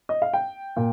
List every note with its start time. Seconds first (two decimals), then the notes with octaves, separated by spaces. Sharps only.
0.09 D#5
0.22 F5
0.33 G5
0.76 A#2